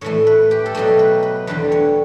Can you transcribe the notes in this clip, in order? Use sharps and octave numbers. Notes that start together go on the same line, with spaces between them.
A2 E3 A3 C#5
B4
G4
A4
B2 F#3 A3 G4
B4
B4
E2 D3 G3 B4
C#5